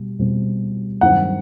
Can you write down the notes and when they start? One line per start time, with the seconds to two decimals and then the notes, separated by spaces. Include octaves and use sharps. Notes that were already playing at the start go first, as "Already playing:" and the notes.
Already playing: B2 G3
0.19 B2 G3 C4
1.01 G2 D#3 F#3 C4 F#5